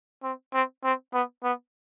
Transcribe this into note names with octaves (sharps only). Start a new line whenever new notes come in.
C4
C4
C4
B3
B3